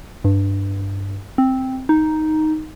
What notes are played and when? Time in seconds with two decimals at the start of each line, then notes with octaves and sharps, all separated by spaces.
0.24 G2
1.38 C4
1.89 D#4